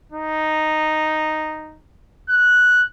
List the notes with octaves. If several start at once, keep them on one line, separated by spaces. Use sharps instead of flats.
D#4
F#6